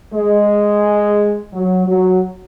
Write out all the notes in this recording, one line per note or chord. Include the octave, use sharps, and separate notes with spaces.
G#3
F#3
F#3